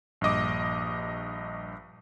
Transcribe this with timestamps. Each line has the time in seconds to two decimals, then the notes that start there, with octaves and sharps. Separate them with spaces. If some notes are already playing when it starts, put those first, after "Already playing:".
0.21 A#1 G2 D#5 D6